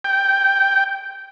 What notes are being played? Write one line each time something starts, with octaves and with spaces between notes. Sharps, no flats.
G5